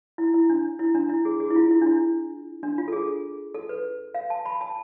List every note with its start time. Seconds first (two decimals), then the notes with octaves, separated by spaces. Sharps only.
0.18 E4
0.34 E4
0.50 D4
0.79 E4
0.95 D4
1.09 E4
1.25 G#4
1.40 G#4
1.50 E4
1.56 F4
1.71 E4
1.82 D4
1.87 E4
2.63 D4
2.78 F4
2.88 A4
2.92 G#4
3.55 A4
3.69 B4
4.15 F5
4.30 A5
4.46 B5
4.61 A5